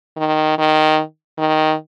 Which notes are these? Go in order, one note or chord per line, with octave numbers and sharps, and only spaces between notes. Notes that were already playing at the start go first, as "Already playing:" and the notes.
D#3
D#3
D#3